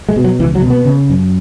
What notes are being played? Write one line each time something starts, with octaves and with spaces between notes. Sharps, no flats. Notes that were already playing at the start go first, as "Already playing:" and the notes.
G#3
B2
F#3
C#2 E3
F#3
B2
B3
C#3
F#2